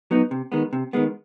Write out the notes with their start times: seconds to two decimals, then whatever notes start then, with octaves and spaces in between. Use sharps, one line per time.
0.11 F#3 B3 D#4
0.31 C3
0.52 D#3 G#3 B3
0.73 C3
0.93 D#3 G#3 B3